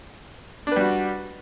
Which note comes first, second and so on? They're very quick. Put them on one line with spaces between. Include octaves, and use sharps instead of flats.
D4 B4 G3 F#4